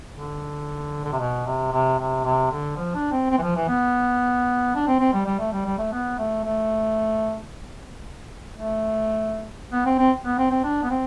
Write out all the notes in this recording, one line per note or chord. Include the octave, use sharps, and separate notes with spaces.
D3
D3
C3
B2
C3
C3
C3
C3
D3
F3
D4
C4
C4
E3
F3
E3
B3
D4
C4
C4
G3
G3
A3
G3
G3
A3
B3
A3
A3
A3
B3
C4
C4
B3
C4
C4
D4
B3
C4